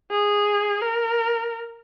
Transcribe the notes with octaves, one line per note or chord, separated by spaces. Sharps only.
G#4
A#4